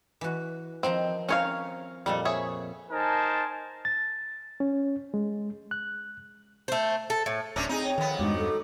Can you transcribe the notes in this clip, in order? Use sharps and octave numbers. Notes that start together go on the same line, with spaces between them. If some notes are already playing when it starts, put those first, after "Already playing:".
E3 F#4
D#3 F3 C4 A#5
C4 C#4 A#4 C#5 F5
F2 A#2 G3 A4
G#4 C#5 E5
D#4 A#4 C5 G#5 A5
A6
C#4
G#3
F#6
A3 C5
A4
A2
D1 C3 C#4 D4
C4 D#4 G#4
C#5 G5
F2 D#3 B3
E2 G2 G#3 D4 D#4 F#4 D6
A4